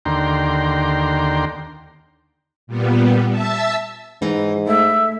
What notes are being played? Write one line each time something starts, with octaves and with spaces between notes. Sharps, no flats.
D#2 D3 G5 A#5 C6
A#2 G3 B3
E5 A5 E6
G#2 E3 D#4
A3 E5